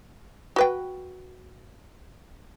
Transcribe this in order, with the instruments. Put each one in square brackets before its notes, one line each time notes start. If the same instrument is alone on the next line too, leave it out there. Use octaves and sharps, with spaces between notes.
[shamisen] F#4 B4 G5